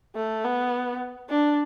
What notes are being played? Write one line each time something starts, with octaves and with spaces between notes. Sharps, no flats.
A3
B3
D4